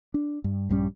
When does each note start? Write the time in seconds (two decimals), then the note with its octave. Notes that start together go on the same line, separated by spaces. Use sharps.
0.14 D4
0.44 G2
0.69 A#1 G2 G3 C#4